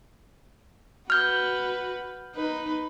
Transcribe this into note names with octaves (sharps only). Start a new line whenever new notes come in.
F#4 B4 F6 G6
D#4 B4